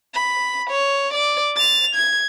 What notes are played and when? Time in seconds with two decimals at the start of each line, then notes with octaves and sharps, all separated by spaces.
0.14 B5
0.70 C#5
1.14 D5
1.56 A6 F7
1.95 G#6